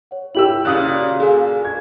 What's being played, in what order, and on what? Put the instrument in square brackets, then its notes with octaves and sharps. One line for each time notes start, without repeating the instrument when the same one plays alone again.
[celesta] C#5 F#5
[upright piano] E4 G4 E6 [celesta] F#7
[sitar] A#2 C#3 [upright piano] D#6 F#6
[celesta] F#4 D5 F5
[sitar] A#2 [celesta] G#4 A4 G#5
[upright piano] G#6